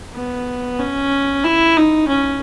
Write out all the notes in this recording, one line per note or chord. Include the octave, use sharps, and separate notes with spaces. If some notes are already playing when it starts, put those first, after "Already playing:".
B3
C#4
E4
D#4
C#4